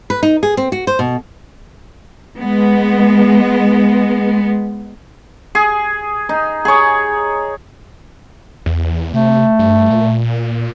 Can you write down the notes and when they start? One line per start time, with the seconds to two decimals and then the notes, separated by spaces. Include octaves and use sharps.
0.10 B4
0.23 D#4
0.43 G#4
0.57 C4
0.72 F#4
0.87 C5
0.99 B2
2.37 G#3 B3
5.55 G#4
6.29 D#4
6.65 G#4 C#5
8.66 E2
9.14 C3 A3
9.59 G2
9.90 A#2